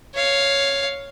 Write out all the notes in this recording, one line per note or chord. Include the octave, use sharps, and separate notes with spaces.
C#5 F5